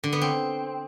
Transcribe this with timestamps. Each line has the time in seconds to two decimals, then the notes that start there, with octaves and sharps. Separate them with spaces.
0.04 D3
0.13 B3
0.22 C4